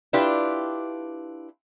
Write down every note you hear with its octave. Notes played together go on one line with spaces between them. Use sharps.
D4 E4 F4 G4 B4